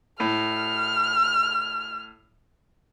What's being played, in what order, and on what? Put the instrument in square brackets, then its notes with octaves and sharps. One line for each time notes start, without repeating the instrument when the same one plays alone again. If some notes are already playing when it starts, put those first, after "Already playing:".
[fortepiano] A2 [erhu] F6